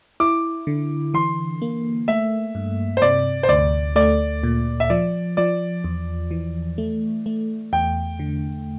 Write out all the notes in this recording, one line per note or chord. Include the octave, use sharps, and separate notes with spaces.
E4 D6
D3
E3 C6
A#3
A3 E5
G2
C5
C3 D5
C5
D2 D5
A3 D5
A#2
E5
F3 D5
F3 D5
E2
E3
A3
A3
E2 G5
D3